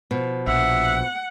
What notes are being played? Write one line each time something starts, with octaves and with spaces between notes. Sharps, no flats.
B2 F3
A#1 E5 F#5